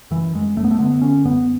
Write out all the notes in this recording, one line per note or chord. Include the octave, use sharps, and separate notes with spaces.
F#2 E3
F#2 G#3
F#2 A3
B3
A3
D3 B3
D3 C#4
F#2 B3